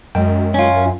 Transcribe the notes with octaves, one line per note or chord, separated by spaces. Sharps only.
F#2 G#3 D#5 G5
C#4 F4